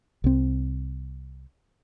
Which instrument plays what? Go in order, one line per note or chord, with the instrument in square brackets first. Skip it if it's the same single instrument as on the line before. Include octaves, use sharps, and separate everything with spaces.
[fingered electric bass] C2 C4